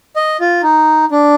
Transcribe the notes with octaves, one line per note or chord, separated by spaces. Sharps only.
D#5
F4
D#4
D4